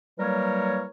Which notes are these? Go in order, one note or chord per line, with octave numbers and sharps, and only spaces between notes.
E3 F#3 G3 A#3 A#4 C#5